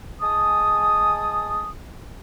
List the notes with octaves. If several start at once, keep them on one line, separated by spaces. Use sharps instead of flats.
G#3 G#5 A5 D#6